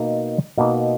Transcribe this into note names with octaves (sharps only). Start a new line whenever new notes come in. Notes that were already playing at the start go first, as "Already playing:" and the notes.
Already playing: B2 A#3 D#4
B2 A#3 D#4